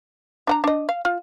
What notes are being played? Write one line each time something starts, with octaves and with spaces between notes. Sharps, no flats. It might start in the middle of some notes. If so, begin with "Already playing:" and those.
D4 F#5 A#5
D4 D#5
F5
F4